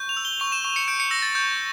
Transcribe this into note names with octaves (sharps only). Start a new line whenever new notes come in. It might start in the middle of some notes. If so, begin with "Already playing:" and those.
Already playing: C#6 G6
F7
E6
G7
C#6 F7
E7
C#6
C#7
G6 D7
C#7
E6 A#6
A6
C#6 G6